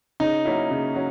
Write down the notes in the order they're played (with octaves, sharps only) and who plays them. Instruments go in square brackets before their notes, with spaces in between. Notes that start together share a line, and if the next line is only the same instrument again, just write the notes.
[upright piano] C#3 [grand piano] D#4
[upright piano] F#3 A#3 C#4 E4
C#3
F#3 C#4